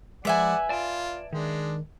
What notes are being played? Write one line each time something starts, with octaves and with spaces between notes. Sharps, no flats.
F3 G#3 B4 D5 E5 F#5 G#5
F4 D5 A5
D#3 G#3 D4